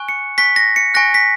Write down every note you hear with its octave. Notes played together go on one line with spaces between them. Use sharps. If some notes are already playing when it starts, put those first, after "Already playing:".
Already playing: G#5 C#6 F#6
C#7
G#5 C#6 F#6 B6
A#6
C#7
G#5 C#6 F#6 A#6
B6